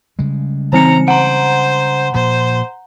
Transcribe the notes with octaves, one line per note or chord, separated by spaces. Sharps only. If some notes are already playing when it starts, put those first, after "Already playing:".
C#3 G3 G#3
E3 C4 A#5 C#7
C5 F#5 A#5
A#2 F3 C5